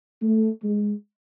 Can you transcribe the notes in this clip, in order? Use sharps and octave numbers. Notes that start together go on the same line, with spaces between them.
A3
G#3